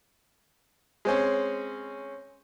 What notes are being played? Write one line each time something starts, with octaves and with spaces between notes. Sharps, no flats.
G#3 C4 C#4